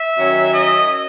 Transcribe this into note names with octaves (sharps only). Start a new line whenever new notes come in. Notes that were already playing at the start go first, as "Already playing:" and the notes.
Already playing: E5
D#3 F#3 C#4
D#5